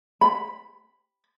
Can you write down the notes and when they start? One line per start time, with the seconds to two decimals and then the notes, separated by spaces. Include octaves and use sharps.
0.21 B5